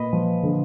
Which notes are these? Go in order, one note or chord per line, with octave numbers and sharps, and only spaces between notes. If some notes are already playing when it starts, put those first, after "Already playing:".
Already playing: A#2 B4 D#5
F3
D3